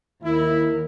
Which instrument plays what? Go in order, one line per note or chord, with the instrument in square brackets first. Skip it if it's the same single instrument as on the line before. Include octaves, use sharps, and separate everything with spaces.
[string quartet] D#2 A#4 [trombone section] E4